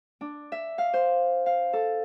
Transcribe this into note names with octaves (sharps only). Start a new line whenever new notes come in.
D4
E5
F5
C5
F5
A4